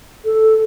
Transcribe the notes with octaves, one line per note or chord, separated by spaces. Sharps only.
A4